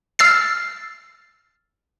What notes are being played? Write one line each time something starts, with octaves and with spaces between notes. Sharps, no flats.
E6 F6 A6 C7